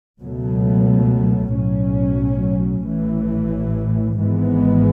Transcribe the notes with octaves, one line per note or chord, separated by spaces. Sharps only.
C#2 B2 F#3 A3
B1 A2 F#3 C#4
A1 A2 E3
G#1 G#2 E3 G#3 B3